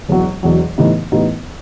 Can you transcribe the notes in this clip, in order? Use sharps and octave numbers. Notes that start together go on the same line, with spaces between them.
E1 E2 B2 F#3
E1 E2 B2 F#3
A2 E3 G3 B3 D#4
A2 E3 G3 B3 D#4